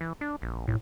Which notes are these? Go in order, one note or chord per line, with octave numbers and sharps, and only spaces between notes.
E3
D4
A#1
B1 A2